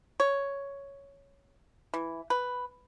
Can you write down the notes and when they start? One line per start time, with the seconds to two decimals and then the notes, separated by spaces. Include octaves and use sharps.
0.20 C#5
1.94 E3
2.30 B4